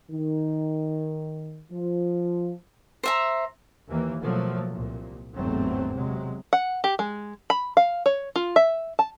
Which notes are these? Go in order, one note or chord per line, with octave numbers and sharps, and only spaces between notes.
D#3
F3
C5 E5 A#5
D#2 E3 A#3
B2 F3 F#3 A3 A#3
C2 A#2
G1 E2 G#2 F#3 A3 C4
C3 F#3 G#3
F#5
G4
G#3
B5
F5
C#5
F4
E5
A5